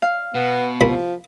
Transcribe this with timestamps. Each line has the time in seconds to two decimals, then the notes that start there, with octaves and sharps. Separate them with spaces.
0.02 F5
0.35 B2 B3
0.81 C2 F3 A#3 B5